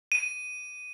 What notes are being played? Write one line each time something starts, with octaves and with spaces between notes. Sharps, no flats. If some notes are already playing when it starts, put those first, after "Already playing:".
D#7